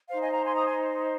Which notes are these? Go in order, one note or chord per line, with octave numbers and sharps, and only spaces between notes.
D#4 C5 F5
D#5 G#5
F5 A#5
G#5 C6
A#5 D#6
G#5 C6